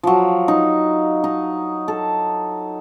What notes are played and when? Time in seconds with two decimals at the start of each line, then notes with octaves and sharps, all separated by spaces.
0.03 F3 F#3
0.48 D#4
1.24 D#4
1.88 A4